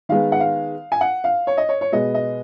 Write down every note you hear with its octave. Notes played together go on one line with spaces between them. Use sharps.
D#3 G#3 B3 F5
F#5
F5
G#5
F#5
F5
C#5
D#5
C#5
C#5
B2 G#3 B3 D#5
D#5